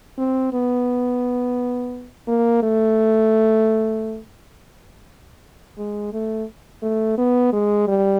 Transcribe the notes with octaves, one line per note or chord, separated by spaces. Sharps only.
C4
B3
A#3
A3
G#3
A3
A3
B3
G#3
G3